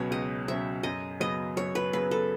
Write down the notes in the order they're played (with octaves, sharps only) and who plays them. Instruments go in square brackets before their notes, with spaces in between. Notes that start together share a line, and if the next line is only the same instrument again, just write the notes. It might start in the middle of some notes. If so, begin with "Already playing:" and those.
Already playing: [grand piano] C#2 B2 F#3 C#4 [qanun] B4 C#5
[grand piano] C#2 [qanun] D#5
[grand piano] B2 F#3 C#4 [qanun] E5
[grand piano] F#2 [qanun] D#5
[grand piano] C#3 F#3 B3 [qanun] D#5
[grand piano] F#2 [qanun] C#5
[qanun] B4
[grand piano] C#3 F#3 B3 [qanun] B4
[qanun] A4